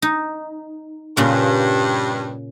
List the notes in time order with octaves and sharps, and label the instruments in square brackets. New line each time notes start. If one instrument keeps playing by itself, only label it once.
[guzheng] D#4
[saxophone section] G2 [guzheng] A#2 C#3